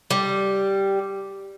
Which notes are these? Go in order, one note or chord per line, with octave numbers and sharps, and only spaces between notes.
G3